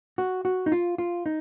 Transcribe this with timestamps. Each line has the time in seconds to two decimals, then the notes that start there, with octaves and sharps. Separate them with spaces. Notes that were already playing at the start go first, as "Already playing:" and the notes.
0.18 F#4
0.45 F#4
0.66 D#4
0.72 F4
0.98 F4
1.26 D#4